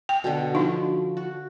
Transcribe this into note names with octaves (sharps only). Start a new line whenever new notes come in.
G5
B2 D3
F3 D4 D#4
F#4